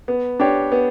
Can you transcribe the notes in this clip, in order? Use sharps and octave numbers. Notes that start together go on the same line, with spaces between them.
B3
D4 G4 C#5
B3